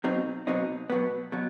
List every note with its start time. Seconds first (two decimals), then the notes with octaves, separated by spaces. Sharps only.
0.04 B2 F#3 C4 D#4
0.47 B2 F#3 C4 D#4
0.90 B2 F#3 B3
1.32 B2 F#3